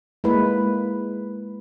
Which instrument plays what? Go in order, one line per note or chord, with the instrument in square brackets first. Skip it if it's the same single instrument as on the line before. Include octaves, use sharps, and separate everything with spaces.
[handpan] G#3 A#3 E4 B4